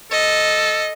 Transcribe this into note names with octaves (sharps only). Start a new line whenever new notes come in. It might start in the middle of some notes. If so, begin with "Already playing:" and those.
A4 D#5